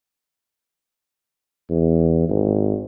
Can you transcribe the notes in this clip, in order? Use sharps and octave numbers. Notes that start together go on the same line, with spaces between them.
E2
G#1